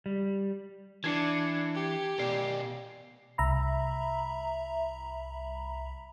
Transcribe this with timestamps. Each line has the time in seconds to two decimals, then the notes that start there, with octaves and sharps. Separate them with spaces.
0.06 G3
1.04 E3 D4 G#6 C7 C#7
1.74 G4
2.19 B2 D5 C7
3.38 C2 E5 A#5 B5